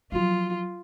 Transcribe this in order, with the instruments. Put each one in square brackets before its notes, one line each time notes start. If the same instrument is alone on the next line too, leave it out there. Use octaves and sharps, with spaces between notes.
[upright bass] F3 F#3 [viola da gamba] F4